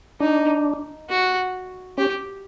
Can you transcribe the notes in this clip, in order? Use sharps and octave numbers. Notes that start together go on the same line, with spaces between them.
D4 D#4
F#4
C#4 G4